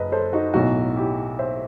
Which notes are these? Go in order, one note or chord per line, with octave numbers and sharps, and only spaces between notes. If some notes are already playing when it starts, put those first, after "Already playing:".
Already playing: F#1 B4 D#5
A4 C5
D#4 F#4
B1 A2 F#3 D#4 F#4
E4 G4
C5 E5